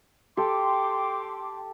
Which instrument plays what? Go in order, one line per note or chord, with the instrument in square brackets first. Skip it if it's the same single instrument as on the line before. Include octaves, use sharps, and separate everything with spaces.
[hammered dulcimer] G4 A4 [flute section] G5 C6 D6